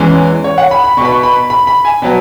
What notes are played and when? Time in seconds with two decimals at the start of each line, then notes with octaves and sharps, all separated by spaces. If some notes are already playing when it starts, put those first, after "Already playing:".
Already playing: E2 E3 G#3 C#4
0.44 C#5
0.58 F#5
0.71 B5
0.84 B5
0.97 B2 C#6
1.01 B3 B5
1.12 C#6
1.23 B5
1.50 B5
1.67 B5
1.85 G#5
2.02 B2 F#3 B3